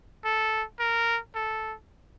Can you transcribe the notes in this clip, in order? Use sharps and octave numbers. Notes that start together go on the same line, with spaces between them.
A4
A#4
A4